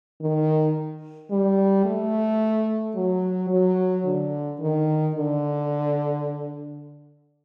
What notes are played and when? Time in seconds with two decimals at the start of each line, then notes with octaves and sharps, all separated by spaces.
0.21 D#3
1.30 G3
1.85 A3
2.95 F#3
3.50 F#3
4.05 D3
4.60 D#3
5.15 D3